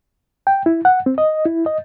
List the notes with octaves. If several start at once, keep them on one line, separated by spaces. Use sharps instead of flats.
G5
E4
F#5
C4
D#5
E4
D#5